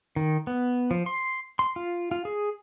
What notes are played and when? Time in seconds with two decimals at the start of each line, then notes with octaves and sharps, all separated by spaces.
0.16 D#3
0.47 B3
0.91 F3
1.06 C6
1.59 C6
1.76 F4
2.11 F4
2.25 G#4